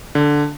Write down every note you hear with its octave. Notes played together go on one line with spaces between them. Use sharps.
D3